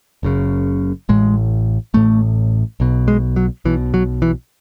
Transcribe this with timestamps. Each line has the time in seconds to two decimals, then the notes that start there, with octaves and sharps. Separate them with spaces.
0.23 F#1 F#2 C#3
1.09 A1 A2 G#3
1.94 A1 A2 A3
2.80 B1 B2
3.08 G#3
3.36 F#3
3.65 B1 B2 E3
3.94 F#3
4.22 E3